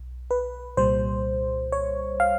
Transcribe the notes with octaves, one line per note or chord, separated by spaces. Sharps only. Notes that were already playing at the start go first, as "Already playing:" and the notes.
Already playing: B1
B4
C2 A#2 G3 C5
C#5
F5